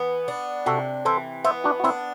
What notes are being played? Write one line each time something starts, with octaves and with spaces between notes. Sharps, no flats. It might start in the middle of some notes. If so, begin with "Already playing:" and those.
Already playing: E3 B3
D4
C3 F#4 A4
E3 A4 C5
B3 C5 E5
D4 F#4
F#4
C4 D4 E4